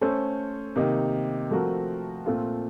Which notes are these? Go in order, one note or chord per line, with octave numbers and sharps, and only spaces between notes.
A3 C#4 A4 C5
C3 D#3 A#3 D#4
F3 A3 C4 F#4 A#4
A#2 A3 C4 F4